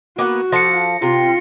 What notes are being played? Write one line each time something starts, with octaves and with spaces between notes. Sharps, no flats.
A#3 B3 F#4 F#5
F3 A4 F5 A#6 C#7
C3 F4